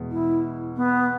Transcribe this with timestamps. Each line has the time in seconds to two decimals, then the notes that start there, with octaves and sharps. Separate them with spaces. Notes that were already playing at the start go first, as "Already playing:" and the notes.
Already playing: E2 B2 G#3
0.11 E4
0.75 B3